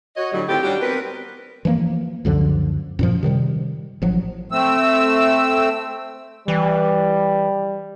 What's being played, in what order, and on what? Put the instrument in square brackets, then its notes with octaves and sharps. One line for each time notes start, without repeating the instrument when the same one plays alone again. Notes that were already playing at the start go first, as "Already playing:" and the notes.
[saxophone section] F#4 C#5 D#5
A2 D3 F#3 G3
A2 D#3 C4 F4 G4
F#3 G3 C#4 D4 F#4 G4
B3 C4 A#4 B4
[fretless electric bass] E3 F3 G#3 A#3
C#2 F#2 D3 F3
F#2 A#2 F3
C3 D#3 F#3 G3
A1 F3 F#3
[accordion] A3 C4 E6
[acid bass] E3 [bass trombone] G3